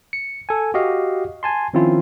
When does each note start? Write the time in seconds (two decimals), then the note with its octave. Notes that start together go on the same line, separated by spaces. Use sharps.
0.13 C#7
0.49 A4 G#5
0.74 F#4 G4 D#5 F5
1.43 G#5 A5 C6
1.74 D#3 F3 C4 C#4 E4 F4